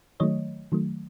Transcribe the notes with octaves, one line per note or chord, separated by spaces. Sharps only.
D#3 F#3 A3 C#5 D#5
D#3 F#3 A3